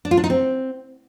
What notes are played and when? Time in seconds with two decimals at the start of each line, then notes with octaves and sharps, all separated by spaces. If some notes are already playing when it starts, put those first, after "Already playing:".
0.05 D4
0.11 F4
0.17 D4
0.24 D#4
0.30 C4